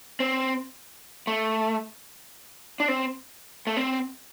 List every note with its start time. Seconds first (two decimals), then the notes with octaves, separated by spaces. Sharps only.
0.20 C4
1.27 A3
2.80 D4
2.88 C4
3.67 A3
3.77 C4